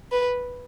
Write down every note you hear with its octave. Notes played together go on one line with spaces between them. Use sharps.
B4